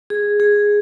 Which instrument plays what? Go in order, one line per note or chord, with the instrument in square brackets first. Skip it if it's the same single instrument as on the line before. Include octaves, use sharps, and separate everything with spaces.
[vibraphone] G#4
G#4